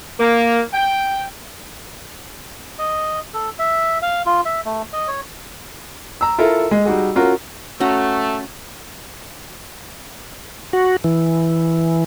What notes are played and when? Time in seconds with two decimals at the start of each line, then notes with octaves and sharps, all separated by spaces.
0.20 A#3
0.73 G5
2.79 D#5
3.34 A4
3.59 E5
4.02 F5
4.26 F4
4.45 E5
4.65 A3
4.93 D#5
5.08 C#5
6.21 A#5 E6
6.38 E4 F4 A4 A#4 A#5
6.71 G#3
6.85 G3 D#4 F#4 G#4
7.16 C#4 F4 F#4 A#4
7.80 A3 C#4 F#4 A#5
10.73 F#4
11.04 E3